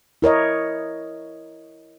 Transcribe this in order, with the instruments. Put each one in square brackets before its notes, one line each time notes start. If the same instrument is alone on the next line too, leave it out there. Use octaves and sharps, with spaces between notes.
[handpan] E4 A#4 C#5 D#5